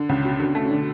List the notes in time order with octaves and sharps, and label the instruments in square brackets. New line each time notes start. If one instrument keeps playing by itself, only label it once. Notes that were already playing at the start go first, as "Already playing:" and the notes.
Already playing: [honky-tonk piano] D3
[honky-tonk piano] C#2 [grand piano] C#3 C#4
[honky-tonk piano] B2
D3
A3
[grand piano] C#4
D3 D4